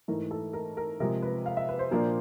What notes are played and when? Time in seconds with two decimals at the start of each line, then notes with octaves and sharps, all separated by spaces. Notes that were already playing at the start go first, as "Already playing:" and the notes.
0.08 G#2 E3 A3 A#4
0.31 A4
0.53 A#4
0.77 A#4
1.00 C3 F3 G#3 A#4
1.22 B4
1.46 F5
1.57 E5
1.69 B4
1.79 C5
1.91 A#2 F3 A#3 D4